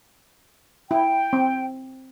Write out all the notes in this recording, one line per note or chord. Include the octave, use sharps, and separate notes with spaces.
E4 G5
C4